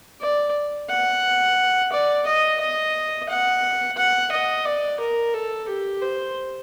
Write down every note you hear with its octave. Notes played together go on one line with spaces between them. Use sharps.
D5
F#5
D5
D#5
D#5
F#5
F#5
D#5
D5
A#4
A4
G4
C5